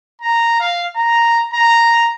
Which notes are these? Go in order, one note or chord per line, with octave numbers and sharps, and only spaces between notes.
A#5
F5
A#5
A#5